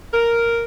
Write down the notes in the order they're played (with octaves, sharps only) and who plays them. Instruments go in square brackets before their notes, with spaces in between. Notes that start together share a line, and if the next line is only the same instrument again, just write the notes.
[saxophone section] A#4